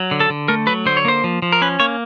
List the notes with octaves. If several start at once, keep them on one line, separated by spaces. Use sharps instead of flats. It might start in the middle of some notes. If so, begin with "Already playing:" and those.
Already playing: F#3
D3
A4
D3
A3 A#4
F#3 B4
D3 C5
C#5
A#3 C5
F3
F3
A#4
C#4 B4
A#3 C#5